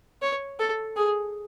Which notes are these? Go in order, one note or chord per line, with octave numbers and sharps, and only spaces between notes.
C#5
A4
G#4